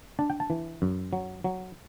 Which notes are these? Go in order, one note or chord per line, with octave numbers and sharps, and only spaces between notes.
D4 A5
G5
A5
E3
F#2
F#3
F#3